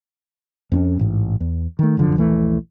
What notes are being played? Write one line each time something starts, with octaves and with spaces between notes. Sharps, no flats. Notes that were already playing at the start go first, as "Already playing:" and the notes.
F2 C4 C#4
A1 G#2
E2
D#3 A3
F1 F#2 D3 F3
D#1 A#1 E3 A3